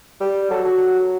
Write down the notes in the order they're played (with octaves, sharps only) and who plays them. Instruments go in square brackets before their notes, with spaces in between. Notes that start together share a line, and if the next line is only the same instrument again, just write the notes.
[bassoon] G3
[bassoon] F#3 [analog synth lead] A4
[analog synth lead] F#4